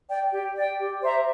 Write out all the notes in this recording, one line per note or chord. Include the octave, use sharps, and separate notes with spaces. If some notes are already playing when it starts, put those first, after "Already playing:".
D5 G5
G4
D5 G5
G4
C5 E5 A#5